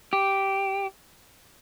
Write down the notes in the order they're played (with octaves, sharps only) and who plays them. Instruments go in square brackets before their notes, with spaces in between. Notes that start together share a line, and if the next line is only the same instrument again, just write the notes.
[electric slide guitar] G4